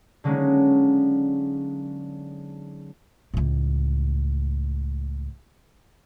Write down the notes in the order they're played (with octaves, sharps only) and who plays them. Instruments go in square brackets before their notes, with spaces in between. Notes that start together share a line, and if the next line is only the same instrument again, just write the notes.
[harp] D3 F#3 G#3 A#3 C#4 D#4
[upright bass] C#2 A2